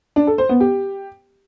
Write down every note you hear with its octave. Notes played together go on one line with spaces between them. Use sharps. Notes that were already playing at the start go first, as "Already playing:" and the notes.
D4
A4
C5
B3
G4